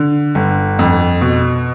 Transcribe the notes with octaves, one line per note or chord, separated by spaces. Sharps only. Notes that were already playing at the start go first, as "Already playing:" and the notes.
Already playing: D3
G1
F2
B2